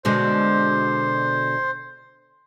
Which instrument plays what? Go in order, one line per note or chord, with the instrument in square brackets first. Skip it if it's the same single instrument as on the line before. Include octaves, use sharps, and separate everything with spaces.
[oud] B2 D3 G#3 [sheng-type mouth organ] C5